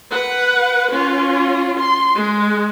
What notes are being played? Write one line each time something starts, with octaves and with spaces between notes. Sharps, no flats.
B4 F#5
C#4 F4
C6
G#3